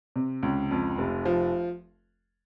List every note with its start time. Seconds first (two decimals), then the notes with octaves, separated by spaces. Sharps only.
0.16 C3
0.43 C#2
0.71 F2
0.98 F1
1.25 F3